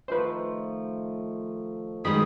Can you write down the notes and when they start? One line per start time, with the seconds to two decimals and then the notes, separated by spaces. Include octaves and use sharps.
0.08 D#3 F3 A3 B4 C5
2.05 B2 D#3 G#3 D5 B5 D#6